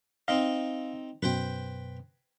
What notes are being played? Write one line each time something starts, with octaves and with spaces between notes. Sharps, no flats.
C4 D#4 D#5 F5
F#2 B2 B4 C5 G5